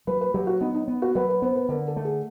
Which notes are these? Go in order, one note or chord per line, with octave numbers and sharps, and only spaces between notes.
F#3 B4
B4
F#3 G4
F#4
B3 D#4
D#4
B3
F#4
F#3 B4
B4
B3 C5
B4
D3 A#4
A4
A3
G#4